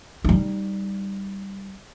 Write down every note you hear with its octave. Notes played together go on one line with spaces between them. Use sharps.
G3 D#4